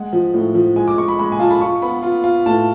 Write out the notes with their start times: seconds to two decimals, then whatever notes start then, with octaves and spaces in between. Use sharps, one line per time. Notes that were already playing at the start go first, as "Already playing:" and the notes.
Already playing: G#3 F#5
0.13 F3
0.34 A2
0.55 F3
0.76 G#3 G#5
0.88 D6
0.97 G#3 C#6
1.08 B5
1.19 G#3 B5
1.32 G#5
1.39 F4 A5
1.51 B5
1.61 F4 C#6
1.82 B3 B5
2.03 F4
2.24 F4
2.46 A2 A5